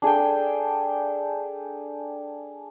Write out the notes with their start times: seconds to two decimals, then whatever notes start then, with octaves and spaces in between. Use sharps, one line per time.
0.02 D4 G#4 A4 G5